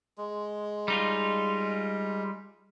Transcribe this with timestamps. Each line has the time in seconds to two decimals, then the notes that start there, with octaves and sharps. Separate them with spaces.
0.18 G#3
0.88 G3 D#4 F4